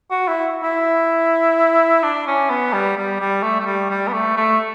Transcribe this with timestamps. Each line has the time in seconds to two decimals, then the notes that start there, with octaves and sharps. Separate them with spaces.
0.10 F#4
0.27 E4
0.63 E4
2.03 D4
2.27 C#4
2.50 B3
2.73 G3
2.97 G3
3.20 G3
3.42 A3
3.60 A3
3.66 G3
3.90 G3
4.08 B3
4.13 A3
4.36 A3